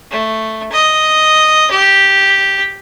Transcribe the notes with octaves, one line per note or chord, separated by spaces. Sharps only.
A3
D#5
G4